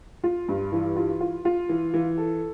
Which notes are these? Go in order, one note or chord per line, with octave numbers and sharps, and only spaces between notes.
F4
G2
E3
F4
F4
F4
E3
E3
A4